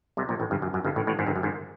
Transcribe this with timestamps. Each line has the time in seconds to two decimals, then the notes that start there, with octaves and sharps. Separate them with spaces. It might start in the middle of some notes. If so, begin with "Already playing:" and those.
0.17 C2 C3
0.29 A#1 A#2
0.40 A1 A2
0.51 G1 G2
0.62 F#2
0.74 F#2
0.85 G1 G2
0.96 A1 A2
1.07 A1 A2
1.19 G#1 G#2
1.26 G1 G2
1.36 F#2
1.43 G#1 G#2